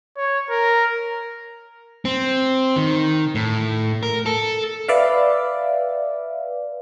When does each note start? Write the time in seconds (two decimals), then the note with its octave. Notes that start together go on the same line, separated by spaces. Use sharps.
0.17 C#5
0.50 A#4
2.05 C4
2.76 D#3
3.35 A2
4.03 A#4
4.26 A4
4.88 B4 D5 E5 F5